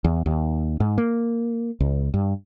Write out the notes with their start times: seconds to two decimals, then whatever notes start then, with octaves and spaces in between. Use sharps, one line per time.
0.04 E2
0.26 D#2
0.80 G#2
0.98 A#3
1.80 C#2
2.14 G2